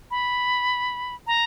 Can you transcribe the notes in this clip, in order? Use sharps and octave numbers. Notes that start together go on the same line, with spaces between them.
B5
A#5